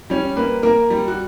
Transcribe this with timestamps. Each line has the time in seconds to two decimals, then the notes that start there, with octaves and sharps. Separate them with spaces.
0.10 G3 C#4
0.36 A#3 B4
0.63 A#3 A#4
0.90 G3
1.08 F#4